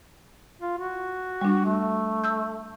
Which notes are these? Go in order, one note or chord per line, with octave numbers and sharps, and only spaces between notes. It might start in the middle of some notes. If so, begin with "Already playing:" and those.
F4
F#4
G3 D4
A3
E6 G6